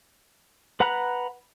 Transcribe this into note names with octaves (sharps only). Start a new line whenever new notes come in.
B4 F#5 A#5 B5 F#6